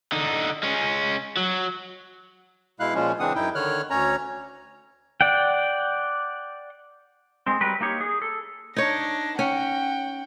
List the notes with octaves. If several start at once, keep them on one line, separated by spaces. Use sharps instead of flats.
D3 D#4
G#3 C#4
F#3
B2 G#3 E4 F5 F#6
A#2 F3 G#3 C#4
C#3 E3 C4 D4 F#5 D#6
F#2 D#4 E4 G5
D3 D#3 C#5 F6 F#6
D2 C#4 C#5 A#5
D5 F#5 G5
G#3 C4
F#3 G3 A#4 B4
A#3 D#4 G4 C#5
G#4
A4
D4 D#4 C#5 A#6
C#4 F#5 G5